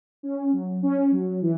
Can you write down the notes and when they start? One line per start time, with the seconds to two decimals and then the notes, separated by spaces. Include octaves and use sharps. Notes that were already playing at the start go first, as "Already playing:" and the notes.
0.23 C#4
0.52 F#3
0.83 C#4
1.12 F#3
1.42 E3